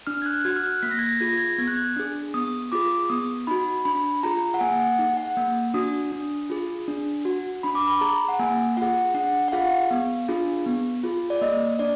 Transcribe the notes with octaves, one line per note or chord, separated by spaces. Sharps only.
D4 F6
G#6
F#6
F#4 G#6
F6
F#6
A#3 B6
A#6
G#6
A#6
F4 G#4 G#6
A#6
G#6
B3 G#6
F#6
G#6
D4 G#4
B3 D#6
F4 G#4 D6
B3 D#6
D#4 F#4 B5
D4 B5
F4 G#4 A#5
F#5
A#3 G#5
F#5
D#4 G#4
F#5
A#3
D4 F#4 D#6
D4
F4 G#4
D4
F#4
D4 B5
D6
B5
G#4 A#5
F#5
A#3 G#5
F4 G#4 F#5
D4 F#5
F#5
F4 G#4 F5
B3
D4 F4 G#4
B3
F4 G#4
D5
A#3 D#5
D4 D5